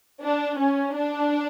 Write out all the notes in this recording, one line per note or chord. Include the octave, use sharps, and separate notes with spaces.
D4
C#4
D4